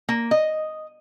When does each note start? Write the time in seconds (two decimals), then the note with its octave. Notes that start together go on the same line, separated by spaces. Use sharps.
0.09 A#3
0.31 D#5